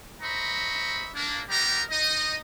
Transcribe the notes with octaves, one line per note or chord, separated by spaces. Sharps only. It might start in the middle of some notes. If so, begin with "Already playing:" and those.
C5 D#5 E5 A#5 B5 C#6
A#3 D4
G3 B3 D#4 G4 A#4 A#5
D#4 D#5